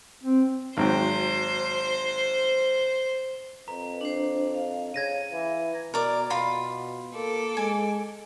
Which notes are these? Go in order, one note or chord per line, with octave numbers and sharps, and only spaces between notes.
C4
G#1 F#3 C5 G5
F2 B4 A#5
D4 C5
F5
C#3 G#6 A#6 D#7
E3
B2 A#4 D5
B2 F4 B5
A#3 A4 D6
G#3 G#5